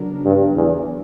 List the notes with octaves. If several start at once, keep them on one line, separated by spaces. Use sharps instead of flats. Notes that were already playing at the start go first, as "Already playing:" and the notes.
Already playing: C#3 F#3 B3 D4 A#4
G2
E2